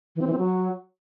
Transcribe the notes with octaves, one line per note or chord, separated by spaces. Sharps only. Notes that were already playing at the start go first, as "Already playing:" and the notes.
E3
C4
E3
C4
F#3